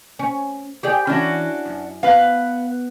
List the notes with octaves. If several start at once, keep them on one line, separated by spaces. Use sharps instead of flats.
C#4
G4 G#4 D5
E3 C#4 D4 F#4
F#2
B3 B4 F5